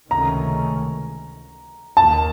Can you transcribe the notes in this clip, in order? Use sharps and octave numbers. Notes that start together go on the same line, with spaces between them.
C#2 C3 D#3 A3 C#4 A#5
D#2 D#3 A#3 A5